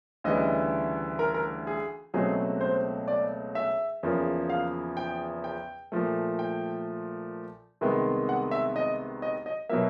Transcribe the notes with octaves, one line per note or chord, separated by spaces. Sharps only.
D2 C#3 E3 G3 D#5
A#4
A#4
G#4
C#2 B2 F#3 A3 C4 G#4
C5
D5
E5
E2 C#3 F3 A#3
F5
G5
G5
A#2 F3 A3
G5
C2 C3 D#3 G#3 B3
F#5
E5
D#5
D#5
D#5
B2 F#3 A#3 E5